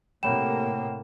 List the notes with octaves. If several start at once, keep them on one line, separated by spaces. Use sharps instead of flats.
A2 C3 A#3 C#5 F#5 G5 B5 E7